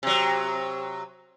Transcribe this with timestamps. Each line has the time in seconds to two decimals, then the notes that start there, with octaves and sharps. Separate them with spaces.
0.03 C3 F#3